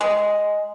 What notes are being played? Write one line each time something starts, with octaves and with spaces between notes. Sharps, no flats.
G#3